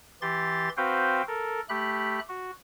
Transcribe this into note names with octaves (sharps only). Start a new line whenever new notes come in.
E3 G4 C6 A6
C4 F#4 B4 C5 F5 G5
A4 A#4
A3 G4 B5 F#6
F#4